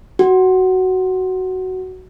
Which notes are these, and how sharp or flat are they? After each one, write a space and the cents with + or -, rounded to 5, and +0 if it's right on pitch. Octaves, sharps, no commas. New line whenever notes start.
F#4 +10